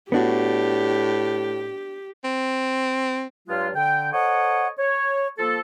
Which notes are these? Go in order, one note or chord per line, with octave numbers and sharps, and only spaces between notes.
A2 B3 D4 F#4 G4
C4
G2 F#3 G#3 F4
D3 G5
A4 C5 C#5 D#5 F#5
C#5
F3 A#3 A4